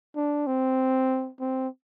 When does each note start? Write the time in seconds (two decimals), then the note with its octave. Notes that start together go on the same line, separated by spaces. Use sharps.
0.16 D4
0.47 C4
1.40 C4